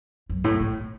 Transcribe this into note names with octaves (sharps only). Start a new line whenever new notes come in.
F#2
A2
A2